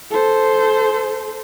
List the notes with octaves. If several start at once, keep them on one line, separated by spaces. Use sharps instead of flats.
A4 C5